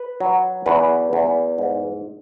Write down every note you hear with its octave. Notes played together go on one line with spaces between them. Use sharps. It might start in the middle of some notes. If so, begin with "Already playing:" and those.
Already playing: B4
F#3
E2 B4
E2
G#2